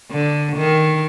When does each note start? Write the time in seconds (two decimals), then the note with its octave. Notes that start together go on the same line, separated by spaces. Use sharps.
0.11 D3
0.57 D#3